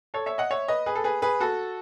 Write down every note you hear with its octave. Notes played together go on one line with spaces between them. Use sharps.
A4 C#5
C#5 E5
D#5 F#5
C#5 E5
B4 D#5
G#4 B4
A4
G#4 B4
G#4 B4
F#4 A4